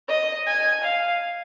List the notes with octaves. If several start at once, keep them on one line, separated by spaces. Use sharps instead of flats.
D#5
G#5
F5